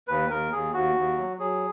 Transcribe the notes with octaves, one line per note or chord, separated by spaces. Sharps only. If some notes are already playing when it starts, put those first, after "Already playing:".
D#2 B4
D#2 A#4
D#2 G#4
D#2 F#4
D#2
F#3
F#3 G#4